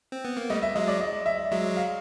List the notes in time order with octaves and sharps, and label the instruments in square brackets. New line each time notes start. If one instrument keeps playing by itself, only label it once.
[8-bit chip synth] C4
B3
A#3
[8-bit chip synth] G3 A3 [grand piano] D#5
[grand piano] E5
[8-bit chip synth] F#3 G#3 [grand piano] D#5
[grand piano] D5
D#5
E5
[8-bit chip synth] F#3 G#3 [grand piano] E5
[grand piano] F5